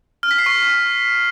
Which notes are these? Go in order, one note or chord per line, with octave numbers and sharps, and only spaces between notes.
F6
B6
C7
C#6